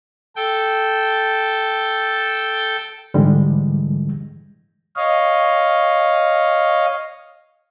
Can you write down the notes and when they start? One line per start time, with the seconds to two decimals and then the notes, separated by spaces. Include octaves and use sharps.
0.36 A4 G5
3.14 G#2 D3 E3 G3 G#3
4.96 C#5 D#5 F5